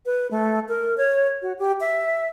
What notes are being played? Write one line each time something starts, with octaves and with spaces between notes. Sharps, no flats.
B4
A3
A#4
C#5
F#4
G4
E5